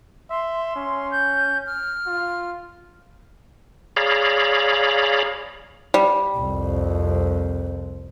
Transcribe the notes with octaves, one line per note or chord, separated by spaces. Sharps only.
E5 C6
C#4
G6
F6
F4
G#4 C#5 D5 F5 A#5 B5
G3
C2 F2